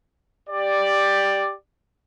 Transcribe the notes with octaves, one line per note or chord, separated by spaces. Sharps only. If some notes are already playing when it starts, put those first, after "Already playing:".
G4 D5